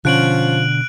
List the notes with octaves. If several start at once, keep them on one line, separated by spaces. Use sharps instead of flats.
B2 D3 F3 C#4 F#6 D7 F#7